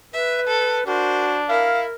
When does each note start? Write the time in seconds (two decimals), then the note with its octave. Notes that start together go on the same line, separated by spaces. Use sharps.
0.13 B4 E5
0.48 A4
0.87 D4 F#4 A#4 C5
1.49 E4 A#4 F5